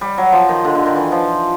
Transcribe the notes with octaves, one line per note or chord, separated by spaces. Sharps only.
G3
F#3
F3
D#3
D3
D3
D#3
E3
F3